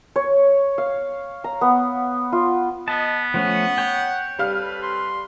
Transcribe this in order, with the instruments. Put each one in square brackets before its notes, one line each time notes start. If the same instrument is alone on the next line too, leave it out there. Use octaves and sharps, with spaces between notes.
[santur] C#5
F5
A#5
B3
F4
[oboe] B3 [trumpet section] D#5 [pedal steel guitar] A5
[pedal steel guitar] F3 A3 C#4 [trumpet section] F#5
[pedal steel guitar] C#5 G5
[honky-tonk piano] G3 F5 F6 [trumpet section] C4 A4 B4
[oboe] C6